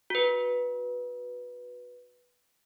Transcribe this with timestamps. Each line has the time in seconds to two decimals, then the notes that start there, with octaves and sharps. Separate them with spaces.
0.10 F#4 B4